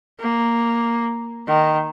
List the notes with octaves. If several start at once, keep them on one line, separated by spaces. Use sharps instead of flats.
A#3
D#3